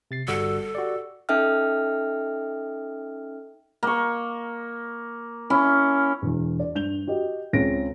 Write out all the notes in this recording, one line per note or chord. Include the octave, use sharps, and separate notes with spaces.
C3 A6 C7
G1 G3 F#4 A4
F#4 G4 D5
C#4 D#4 A4 E5 G5 F6
A#3 C#6
C#4 E4
E1 E2
D5
G2 G6 F7 G7
F#4 G4 D#5
C#2 C4 C#4 A#6 D7